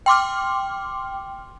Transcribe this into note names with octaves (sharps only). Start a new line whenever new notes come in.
G5 C6 D6 F6